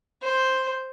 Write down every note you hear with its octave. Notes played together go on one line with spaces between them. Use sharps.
C5